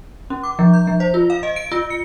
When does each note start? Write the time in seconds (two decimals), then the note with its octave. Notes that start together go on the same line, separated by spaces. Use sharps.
0.30 C#4
0.43 D6
0.59 F3
0.73 G6
0.87 F3
1.00 C5
1.14 F4
1.30 F5
1.43 D#5
1.56 D7
1.72 F4
1.90 C#7